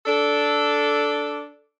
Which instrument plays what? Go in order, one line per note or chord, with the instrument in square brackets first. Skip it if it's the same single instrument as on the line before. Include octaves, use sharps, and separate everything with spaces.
[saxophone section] D4 A4